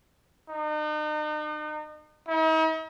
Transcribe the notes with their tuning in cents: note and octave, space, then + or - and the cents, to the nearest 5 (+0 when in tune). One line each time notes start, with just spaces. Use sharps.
D#4 -40
D#4 +45